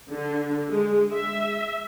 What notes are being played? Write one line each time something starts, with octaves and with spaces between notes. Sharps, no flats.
D3
G#3
E5